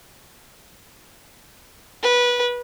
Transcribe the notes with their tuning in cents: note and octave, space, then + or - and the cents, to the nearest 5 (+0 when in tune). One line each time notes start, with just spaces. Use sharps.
B4 -20